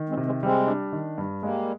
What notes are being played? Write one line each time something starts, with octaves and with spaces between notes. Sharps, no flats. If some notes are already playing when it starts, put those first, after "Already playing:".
Already playing: D#3
G#3 C4
C3
G#3 C4
G3 G#3 C4
D4
D#3
G2
G3 G#3 A#3